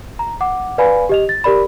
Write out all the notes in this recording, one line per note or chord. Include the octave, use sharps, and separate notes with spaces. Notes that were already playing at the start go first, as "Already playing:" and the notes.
A#5
F#5 D6
B4 D5 F5 G#5 B5
G4 D#5 F7
A6
G4 A#4 D5 B5